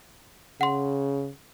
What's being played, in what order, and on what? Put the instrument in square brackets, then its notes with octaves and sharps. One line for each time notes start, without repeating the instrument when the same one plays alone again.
[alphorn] C#3 [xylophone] F#5 C6